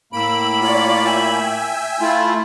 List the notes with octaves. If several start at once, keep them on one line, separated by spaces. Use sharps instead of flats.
A2 A#3 B5 E6 D7
F4 C#5 D5
E5 G5 G#5
A3 E4 F4